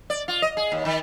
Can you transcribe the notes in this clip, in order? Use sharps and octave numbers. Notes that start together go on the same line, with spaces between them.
D5
F4
D#5
G#4
D#2
D#3